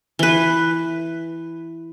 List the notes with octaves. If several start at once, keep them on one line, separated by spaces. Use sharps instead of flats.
E3 B4